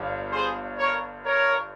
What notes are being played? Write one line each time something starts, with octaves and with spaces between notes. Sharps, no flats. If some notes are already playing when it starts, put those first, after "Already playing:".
Already playing: G1 G2
G#4 C5
A#4 C#5
A#4 C#5